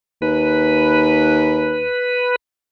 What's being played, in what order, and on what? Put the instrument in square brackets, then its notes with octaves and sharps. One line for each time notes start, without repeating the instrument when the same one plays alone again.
[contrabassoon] D#2 [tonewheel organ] B4